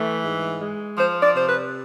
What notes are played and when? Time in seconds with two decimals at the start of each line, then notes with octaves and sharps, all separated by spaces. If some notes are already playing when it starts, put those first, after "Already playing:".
Already playing: E3 A3
0.23 G#2
0.60 G#3
0.98 F3 C5
1.22 D5
1.35 C3 C5
1.47 B4